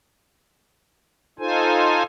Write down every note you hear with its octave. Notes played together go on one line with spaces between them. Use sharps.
D#4 F4 A4 C5 G#5